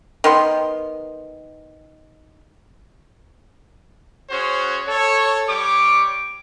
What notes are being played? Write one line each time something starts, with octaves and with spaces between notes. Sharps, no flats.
D#3 B3 C6
C#4 F#4 G#4 C5 C#5
A4 C#5
G3 C#5 D6